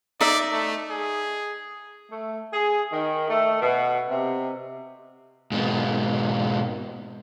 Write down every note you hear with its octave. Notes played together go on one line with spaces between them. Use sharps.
D#4 D5 E5
A3
G#4
A3
G#4
D#3
A3
B2
C3
G#2 B2